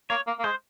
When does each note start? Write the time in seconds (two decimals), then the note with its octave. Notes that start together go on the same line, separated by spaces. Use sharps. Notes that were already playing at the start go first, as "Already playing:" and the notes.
0.10 A#3 C#5
0.27 A#3
0.39 A#3
0.44 G#3 C5